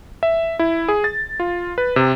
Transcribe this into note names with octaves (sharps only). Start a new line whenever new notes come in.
E5
E4
G#4
A6
F4
B4
C3